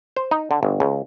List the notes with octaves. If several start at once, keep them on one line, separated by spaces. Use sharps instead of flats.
C5
D#4
D3
G1
C#2